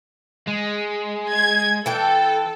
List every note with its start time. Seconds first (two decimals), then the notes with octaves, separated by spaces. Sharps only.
0.48 G#3
1.32 G#6
1.86 E3 A4 G5